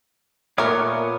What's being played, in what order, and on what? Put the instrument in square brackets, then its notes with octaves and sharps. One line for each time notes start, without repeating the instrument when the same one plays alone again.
[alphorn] A#2 [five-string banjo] A3 A#4 [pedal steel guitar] B3 C#5 D6